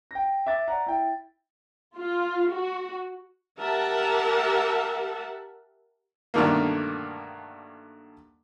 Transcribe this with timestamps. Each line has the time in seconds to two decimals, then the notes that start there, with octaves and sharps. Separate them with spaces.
0.11 G5 A#6
0.46 E5 D6 A6
0.68 D5 F#5 A#5
0.86 E4 G5
1.96 F4
2.53 F#4
3.59 G4 A#4 E5 F#5 A5
6.34 G2 B2 D3 D#3 A3 A#3